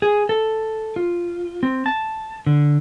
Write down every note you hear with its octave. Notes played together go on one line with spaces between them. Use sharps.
G#4
A4
F4
C4
A5
D3